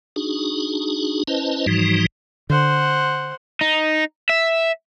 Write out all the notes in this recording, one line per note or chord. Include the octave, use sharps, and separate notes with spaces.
D4 D#4 F#4 G#4
C#4 E4 B4 C5 D#5 A5
G#2 E3 F3 G3 D#4 F#4
D3 C5 F#5
D#4
E5